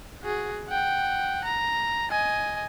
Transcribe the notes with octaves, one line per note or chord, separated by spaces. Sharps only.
F#4 G#4
F#5 G5
A#5
D#5 G#5